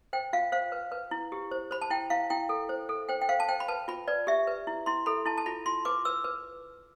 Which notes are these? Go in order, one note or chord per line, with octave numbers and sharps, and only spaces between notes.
C5 G5
F4 F5
C5 F5
B4
B4
E4
G4
C5
C5 B5
A5
E4 G5
E4 F5
E4 G5
A4
C5
A4
C5 G5
G5
C5 F5
A5
C5 G5
B5
B4 A5
F4 B5
B4 D5
G4 E5
B4
E4
E4 C6
A4 B5
E4 A5
A5
F4 B5
F4 C6
B4 D6
B4 E6
B4